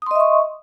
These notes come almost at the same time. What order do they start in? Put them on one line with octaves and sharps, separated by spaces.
D#6 C6 D#5 E5 C#6